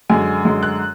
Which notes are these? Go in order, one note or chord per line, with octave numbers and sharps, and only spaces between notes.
F#2 D3 G#3 G#5
F#2 D3 G#3
F#6